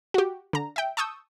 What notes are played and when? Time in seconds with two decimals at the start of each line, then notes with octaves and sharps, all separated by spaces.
0.14 F#4 G4
0.53 D3 A#5
0.76 E5 G5
0.97 A5 C#6 D#6 E6 G6